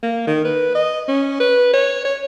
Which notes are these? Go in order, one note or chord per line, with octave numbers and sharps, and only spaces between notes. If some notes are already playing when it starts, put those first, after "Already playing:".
A#3
D#3
B4
D#5
C#4
B4
C#5
C#5